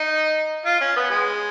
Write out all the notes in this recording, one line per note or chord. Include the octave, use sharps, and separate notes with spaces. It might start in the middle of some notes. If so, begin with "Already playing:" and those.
Already playing: D#4
F4
C#4
B3
G#3